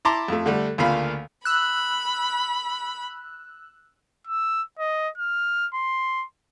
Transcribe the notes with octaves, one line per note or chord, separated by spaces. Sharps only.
E4 A5 A#5 C6 D6
F2 A3
D3 G3 A3
D2 C#3 A#3 F4 F5 B5
B5 E6 F#6
E6
D#5
F6
C6